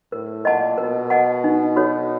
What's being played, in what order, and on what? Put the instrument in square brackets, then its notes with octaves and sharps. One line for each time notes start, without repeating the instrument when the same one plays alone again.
[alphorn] A2 [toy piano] A#4
[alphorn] A#2 [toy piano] D#5 F#5 A5
[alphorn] B2 [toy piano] A#4
[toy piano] D#5 F#5 A5
D#4
F#4 A4 C#5